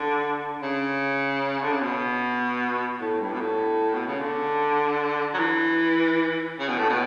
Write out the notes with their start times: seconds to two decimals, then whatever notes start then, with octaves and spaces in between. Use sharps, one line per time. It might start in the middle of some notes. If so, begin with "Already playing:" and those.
Already playing: D3
0.62 C#3
1.63 D3
1.72 C#3
1.82 B2
3.01 A2
3.20 G2
3.33 B2
3.40 A2
3.94 B2
4.07 C#3
4.20 D3
5.34 F#3
5.39 E3
6.59 C#3
6.69 B2
6.78 A2
6.89 B2